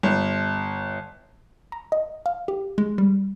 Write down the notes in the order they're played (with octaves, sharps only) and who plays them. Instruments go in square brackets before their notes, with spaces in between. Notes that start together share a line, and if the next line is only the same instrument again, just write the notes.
[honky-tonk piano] G1
[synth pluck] A#5
D#5
F5
G4
G#3
G3